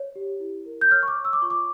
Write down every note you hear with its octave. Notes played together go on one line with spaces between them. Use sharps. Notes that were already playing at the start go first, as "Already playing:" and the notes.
Already playing: C#5
G4
E4
A#4
G6
C#5 F6
C#6
D6
C#5
E6
D6
F4 C#6
D6